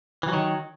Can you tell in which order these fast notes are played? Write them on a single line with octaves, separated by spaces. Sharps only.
E3 F#3 D#3